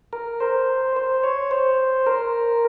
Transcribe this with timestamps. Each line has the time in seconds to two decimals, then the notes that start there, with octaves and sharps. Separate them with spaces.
0.13 A#4
0.40 C5
0.96 C5
1.24 C#5
1.51 C5
2.06 A#4